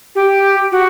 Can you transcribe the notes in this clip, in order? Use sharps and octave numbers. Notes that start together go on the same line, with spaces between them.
G4
F#4